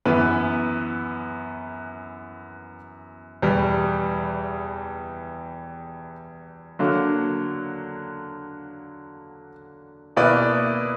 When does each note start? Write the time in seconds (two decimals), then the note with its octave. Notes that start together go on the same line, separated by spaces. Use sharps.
0.05 F#2 E3 B3 E4 B4
3.42 E2 B2 G3
6.79 D3 F#3 A#3
10.16 B2 A#3 E4 B4 D5